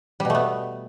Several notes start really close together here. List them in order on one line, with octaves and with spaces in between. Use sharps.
G3 B2 A3 B3